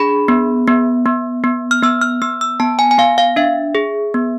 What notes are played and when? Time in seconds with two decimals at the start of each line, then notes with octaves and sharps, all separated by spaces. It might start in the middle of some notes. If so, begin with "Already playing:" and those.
Already playing: D4 G#4 B5
0.28 B3
0.67 B3
1.06 B3
1.44 B3
1.71 F6
1.83 B3 E6
2.01 F6
2.22 B3 E6
2.41 E6
2.60 B3 A5
2.79 G#5
2.91 G#5
2.98 B3 F5
3.18 F5
3.36 D4 E5
3.75 G#4
4.14 B3